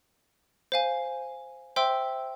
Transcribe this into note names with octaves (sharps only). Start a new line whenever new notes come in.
C5 F5 G#5
C5 E5 G5 C6 E6